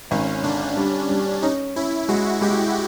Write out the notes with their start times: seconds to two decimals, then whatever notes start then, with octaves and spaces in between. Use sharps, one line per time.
0.11 G#1 C#4
0.44 D3 D4
0.77 G3
1.09 G3
1.42 C#4 D#4
1.76 C#4 E4
2.09 G#3 F#4
2.41 G#3 G4